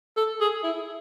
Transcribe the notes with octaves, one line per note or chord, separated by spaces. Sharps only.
A4
G#4
E4